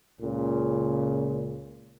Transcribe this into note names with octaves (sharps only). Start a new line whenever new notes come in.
C#2 A#2 C#3